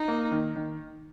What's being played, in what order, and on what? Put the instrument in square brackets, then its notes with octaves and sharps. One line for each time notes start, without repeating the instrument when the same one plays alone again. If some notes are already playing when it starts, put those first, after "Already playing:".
Already playing: [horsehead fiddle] D#4
[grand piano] A#3
D#3
D#3